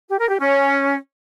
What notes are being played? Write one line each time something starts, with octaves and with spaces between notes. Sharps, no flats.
G4
A#4
G4
C#4